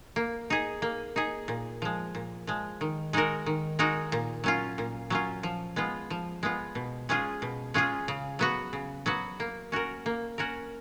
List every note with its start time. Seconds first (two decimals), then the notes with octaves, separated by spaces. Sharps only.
0.16 A#3
0.50 D#4 G#4
0.82 A#3
1.16 D#4 G#4
1.48 A#2
1.82 F3 G#3
2.15 A#2
2.47 F3 G#3
2.81 D#3
3.13 G#3 D#4 F#4 A#4
3.46 D#3
3.79 G#3 D#4 F#4 A#4
4.12 A#2
4.44 F#3 C#4 F4
4.78 A#2
5.10 F#3 C#4 F4
5.43 F3
5.76 G#3 B3 F4
6.10 F3
6.43 G#3 B3 F4
6.75 B2
7.09 G#3 C#4 F4 G#4
7.42 B2
7.74 G#3 C#4 F4 G#4
8.08 C#3
8.39 F#3 B3 F#4
8.73 C#3
9.06 F#3 B3 F#4
9.40 A#3
9.72 C#4 F#4 A#4
10.06 A#3
10.38 C#4 F#4 A#4